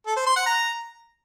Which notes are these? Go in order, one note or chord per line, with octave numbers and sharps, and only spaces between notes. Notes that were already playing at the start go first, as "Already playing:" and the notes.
A4
C5
C6
F#5
A#5